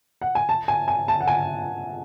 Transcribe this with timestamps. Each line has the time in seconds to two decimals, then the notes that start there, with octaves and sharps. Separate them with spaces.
0.21 F#5
0.35 G#5
0.49 A5
0.68 G#5
0.88 G#5
1.08 A5
1.21 F#5
1.27 G#5